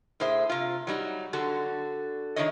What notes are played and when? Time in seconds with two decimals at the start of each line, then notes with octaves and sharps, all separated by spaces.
0.20 A2 G#4 C5 E5
0.49 C3 F4
0.87 F#3 G3 D#4
1.33 D3 F#4 A4
2.36 D#3 F3 D4 E4 C#5 D#5